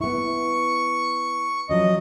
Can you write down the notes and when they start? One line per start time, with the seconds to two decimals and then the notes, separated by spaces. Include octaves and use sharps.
0.01 B3 E4 C#6
1.69 F3 F#3 C#4 D#5